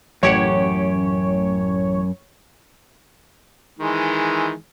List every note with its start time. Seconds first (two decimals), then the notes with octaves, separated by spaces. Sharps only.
0.23 A1 F#2 G4 C#5 F#5
3.79 D#3 E3 G#3